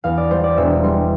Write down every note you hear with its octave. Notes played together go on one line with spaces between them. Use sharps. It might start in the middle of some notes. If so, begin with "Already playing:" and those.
E2 F5
D5
G3 C5
D5
E1 E5
G3 C6